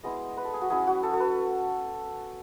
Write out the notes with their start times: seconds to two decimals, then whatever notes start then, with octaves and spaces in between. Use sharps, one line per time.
0.04 G#3 B3 E4 D#5
0.37 B4
0.45 A4
0.54 G#4
0.62 F#4
0.70 F#3 C#4 E4 G#4
0.87 F#4
1.03 A4
1.13 A4
1.20 B4